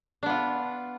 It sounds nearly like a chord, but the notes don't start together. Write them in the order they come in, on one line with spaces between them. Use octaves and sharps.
D4 B3 F4